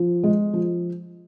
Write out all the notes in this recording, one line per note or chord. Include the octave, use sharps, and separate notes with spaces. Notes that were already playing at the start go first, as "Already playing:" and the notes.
Already playing: F3
G#3
F3